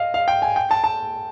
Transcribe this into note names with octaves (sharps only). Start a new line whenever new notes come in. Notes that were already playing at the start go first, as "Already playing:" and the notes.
Already playing: D#5 F5
F5
G5
G#5
G5
A5
A5